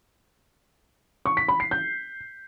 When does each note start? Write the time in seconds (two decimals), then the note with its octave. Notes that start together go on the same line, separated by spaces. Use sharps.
1.26 C#6
1.37 B6
1.48 B5
1.60 C7
1.71 G6